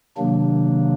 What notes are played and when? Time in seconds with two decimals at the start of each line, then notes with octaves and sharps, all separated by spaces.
0.17 C3 D#3 F#3 A#3 D4